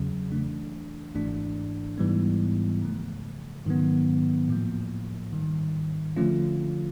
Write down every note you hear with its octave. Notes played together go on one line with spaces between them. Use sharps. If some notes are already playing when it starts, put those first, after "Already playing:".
Already playing: E2 C#3 F#3
E3 A3 D4
G#1 G#2 E3 A3 D4
G#2 E3 G3 B3
C#3 F3 A3
G#2 D#3 F#3 B3
A2 F3 A#3
G#2 D#3 G3
D3 F3 A3 C#4 F4